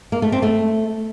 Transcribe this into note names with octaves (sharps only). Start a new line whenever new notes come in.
A#3
A3
C4
A3